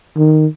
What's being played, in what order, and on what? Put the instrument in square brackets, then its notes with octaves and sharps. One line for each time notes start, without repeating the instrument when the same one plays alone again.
[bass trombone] D#3